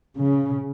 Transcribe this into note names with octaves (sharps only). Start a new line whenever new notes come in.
C#3